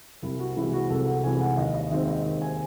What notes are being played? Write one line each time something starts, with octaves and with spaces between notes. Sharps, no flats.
C2 E4
F#4
C3 E3 G#3 E4
F#4
C2 A4
F#5
C3 E3 G#3 G#5
F#5
D#2 D#5
D#5
D#3 G#3 C4 E5
D#5
D#2
G#5